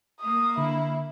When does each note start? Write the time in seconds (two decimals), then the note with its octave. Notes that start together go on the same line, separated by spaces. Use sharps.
0.21 A#3 D#6
0.58 D3 E4